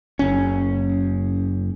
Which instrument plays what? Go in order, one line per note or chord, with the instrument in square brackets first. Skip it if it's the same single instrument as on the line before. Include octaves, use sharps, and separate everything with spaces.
[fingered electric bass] F#1 C#4